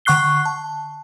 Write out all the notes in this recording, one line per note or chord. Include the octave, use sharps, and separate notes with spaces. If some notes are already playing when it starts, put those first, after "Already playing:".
D3 F#5 C#6 F#6 C7 G7
A5